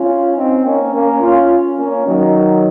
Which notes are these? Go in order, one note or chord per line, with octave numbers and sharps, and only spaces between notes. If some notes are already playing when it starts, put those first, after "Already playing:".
Already playing: C#4 F4
C4 D#4
A#3 C#4
A#3 C#4
C#4 F4
A#3 C#4
D#3 F#3